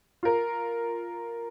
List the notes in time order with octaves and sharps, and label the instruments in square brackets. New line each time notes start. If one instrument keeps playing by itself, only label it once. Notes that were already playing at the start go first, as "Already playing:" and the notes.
[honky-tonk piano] F4 A#4